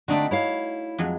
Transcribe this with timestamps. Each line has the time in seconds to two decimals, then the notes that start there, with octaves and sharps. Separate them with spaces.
0.08 D3 A3 C4 D4 D#4 F#4
0.31 E4 C#5 F5
0.98 F2 F#3 G#3